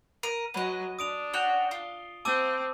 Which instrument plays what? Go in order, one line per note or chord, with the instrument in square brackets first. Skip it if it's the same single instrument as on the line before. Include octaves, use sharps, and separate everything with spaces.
[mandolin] A#4 [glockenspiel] D#7
[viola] F#3 [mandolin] B3 D#5
[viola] D4 [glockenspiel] D#6 D7 F7
[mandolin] F#4 C#5 G5 [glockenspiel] G7
[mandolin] F4
[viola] C4 [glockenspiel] A5 D6 E6